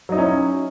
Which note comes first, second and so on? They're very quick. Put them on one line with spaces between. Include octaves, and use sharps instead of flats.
F#3 D#4 E4 C#4